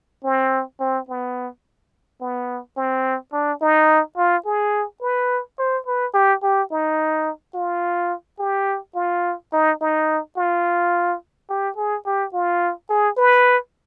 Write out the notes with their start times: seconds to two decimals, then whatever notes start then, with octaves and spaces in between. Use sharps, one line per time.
0.24 C4
0.80 C4
1.09 B3
2.21 B3
2.77 C4
3.33 D4
3.62 D#4
4.17 F4
4.46 G#4
5.02 B4
5.59 C5
5.87 B4
6.14 G4
6.43 G4
6.72 D#4
7.55 F4
8.39 G4
8.95 F4
9.53 D#4
9.81 D#4
10.37 F4
11.50 G4
11.77 G#4
12.06 G4
12.33 F4
12.90 G#4
13.18 B4